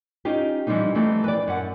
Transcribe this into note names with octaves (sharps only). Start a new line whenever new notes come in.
C#4 D#4 F4 G4
E3 F3 G3 C4 D4 D#4
E3 F3 G3 A3 C4 D#4
B4 D5
F#2 F#5